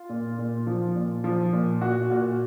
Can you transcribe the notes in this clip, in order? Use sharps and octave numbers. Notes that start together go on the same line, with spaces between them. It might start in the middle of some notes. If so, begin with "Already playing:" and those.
Already playing: F4
A#2
A#2
F3
A#2
F3
A#2
A#2 F#4
A#2 F#4